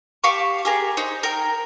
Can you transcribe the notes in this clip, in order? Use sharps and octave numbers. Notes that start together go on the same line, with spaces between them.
G4 F5 A5 C#6
G4 G#4 A#4
D#4 C5
A#4 G5